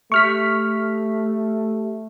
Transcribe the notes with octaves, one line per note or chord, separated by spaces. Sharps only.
A3 G4 E5 C#6 F6 B6